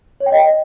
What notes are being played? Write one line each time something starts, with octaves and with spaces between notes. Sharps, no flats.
C#5
G5
D#5